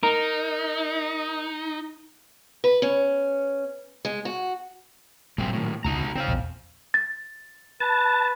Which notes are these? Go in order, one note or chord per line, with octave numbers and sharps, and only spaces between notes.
D#4 A#4
B4
C#4
G#3
F#4
A#2 F#3 G#3 A3 C4
A2 D#3
C#2 B2 D#4 F#4 A#5
C3
C#3 C4 C5 F5
A#1 E2
A6
B4 A5